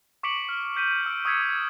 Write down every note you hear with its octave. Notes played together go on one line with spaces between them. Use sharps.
C#6 D6 B6 C#7 D7 F#7
F6
G6 B6 D#7
E6 D7
C#6 D#6 E6 G#6 B6 C#7